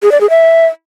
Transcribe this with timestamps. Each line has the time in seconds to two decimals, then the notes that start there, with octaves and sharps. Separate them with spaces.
0.03 G#4
0.12 D5
0.21 G#4
0.30 E5